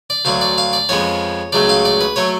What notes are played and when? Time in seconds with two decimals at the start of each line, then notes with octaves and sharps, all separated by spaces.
0.10 D5
0.25 D2 D3 F#3 F5
0.41 D5
0.58 F5
0.73 D5
0.89 F2 F3 G#3 B3 C#5
1.52 C#2 C#3 F#3 A3 D5
1.69 F5
1.85 D5
2.01 B4
2.16 F#3 A3 C#5